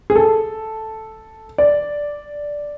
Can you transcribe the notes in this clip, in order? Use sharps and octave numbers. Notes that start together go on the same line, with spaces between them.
G#4
A4
D5